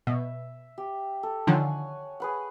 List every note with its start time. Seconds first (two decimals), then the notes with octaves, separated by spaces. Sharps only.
0.07 B2 E5
0.78 G4
1.23 A4
1.47 D3 D#3 F3 C#5 F#5 G#5
2.20 G#4 B4 F#5